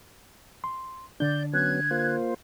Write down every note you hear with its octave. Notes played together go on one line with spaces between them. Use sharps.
C6
D3 D4 D5 G6
F#3 B3 C#4 F#6 G#6
A#3 F4 C5